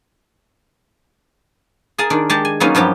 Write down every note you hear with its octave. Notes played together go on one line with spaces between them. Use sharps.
G#4 A#4 G#5 A5
D#3 D4
G#3 G4 G5 A5
G#5
F#3 A#3 B3 C#4 D#4 F4
G2 F3 F#3 G4